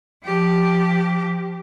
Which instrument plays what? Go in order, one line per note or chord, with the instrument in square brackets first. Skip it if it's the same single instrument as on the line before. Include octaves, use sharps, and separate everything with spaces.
[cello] F3 G4